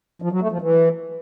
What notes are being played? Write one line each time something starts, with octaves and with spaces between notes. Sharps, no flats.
F3
F#3
A3
F3
E3